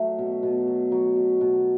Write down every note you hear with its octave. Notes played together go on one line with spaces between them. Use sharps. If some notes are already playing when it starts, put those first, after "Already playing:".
Already playing: F#3 A3
B2
B2
F#3
F#3
B2
B2